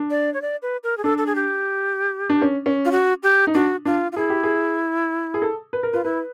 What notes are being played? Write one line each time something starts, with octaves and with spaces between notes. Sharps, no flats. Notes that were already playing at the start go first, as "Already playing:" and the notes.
Already playing: D4
D5
C#5
D5
B4
A#4
G#4
D4 A4
A4
G#4
G4
D4
C#4
C#4
F4
F#4
G4
D#4
D4 F#4
D4 F4
F4
E4 G#4
G4
G#4
G#4
A4
B4
A#4
F4 B4
E4 B4